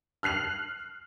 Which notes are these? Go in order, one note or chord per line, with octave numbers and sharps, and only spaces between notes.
F6 F#6 C7 F7